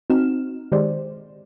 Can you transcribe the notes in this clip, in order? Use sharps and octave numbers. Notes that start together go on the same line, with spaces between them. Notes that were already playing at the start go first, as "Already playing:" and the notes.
C4 D#4 F#4 F6 E7
D#3 G#3 G4 C5 D5